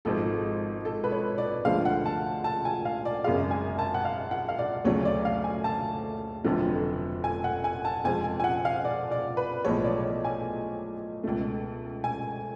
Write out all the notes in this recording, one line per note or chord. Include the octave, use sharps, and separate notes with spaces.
G#1 G#2 F3 A4
A4
B4
C#5
D5
D2 D3 F3 G#3 F5
F#5
A5
A5
G#5
F5
D5
G#1 F#2 C#3 G#3 F5
G#5
A5
F#5
F5
F#5
F5
D5
D2 C#3 F#3 A3 C#5
D5
F5
G#5
A5
F1 F2 D3 F#3 A3
G#5
F#5
G#5
A5
F2 F3 G#3 G#5
G#5
G#5
F#5
F5
D5
D5
B4
B1 A2 F3 G#3 C#5
D5
C#5
G#5
C#2 B2 A3
G#5